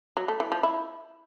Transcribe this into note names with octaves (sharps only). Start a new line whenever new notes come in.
F#3
A3
E3
F3
E4